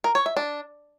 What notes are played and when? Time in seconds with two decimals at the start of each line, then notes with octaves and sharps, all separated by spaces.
0.04 A#4
0.15 C#5
0.26 E5
0.37 D4